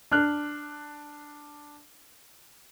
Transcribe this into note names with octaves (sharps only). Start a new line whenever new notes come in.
D4 F6 F#6